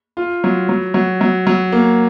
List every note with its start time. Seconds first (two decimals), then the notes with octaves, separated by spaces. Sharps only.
0.17 F4
0.44 F#3
0.69 F#3
0.94 F#3
1.21 F#3
1.47 F#3
1.72 A#3